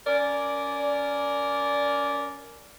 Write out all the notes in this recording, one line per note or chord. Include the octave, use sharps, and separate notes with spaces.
C#4 A#4 D5